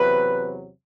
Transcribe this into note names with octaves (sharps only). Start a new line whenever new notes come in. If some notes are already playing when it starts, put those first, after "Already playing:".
Already playing: E2 C3 F#3 B4